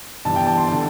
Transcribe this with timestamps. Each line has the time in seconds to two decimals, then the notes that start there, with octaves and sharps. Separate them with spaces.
0.25 G1 G2 E3 A5
0.36 G5
0.47 A5
0.57 C6
0.68 D3 A5